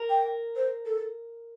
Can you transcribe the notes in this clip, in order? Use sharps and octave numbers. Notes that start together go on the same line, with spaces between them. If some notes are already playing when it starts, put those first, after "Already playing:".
Already playing: A#4
G5
C5
A4